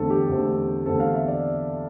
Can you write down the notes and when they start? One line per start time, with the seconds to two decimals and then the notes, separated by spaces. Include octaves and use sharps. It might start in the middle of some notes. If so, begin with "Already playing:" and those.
Already playing: E2 D3 A3 C4 A4
0.10 G4
0.29 E2 D3 A3 C4
0.85 E2 D3 A3 C4 A4
1.00 F5
1.14 E5
1.28 D5